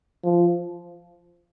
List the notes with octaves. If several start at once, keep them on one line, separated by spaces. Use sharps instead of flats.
F3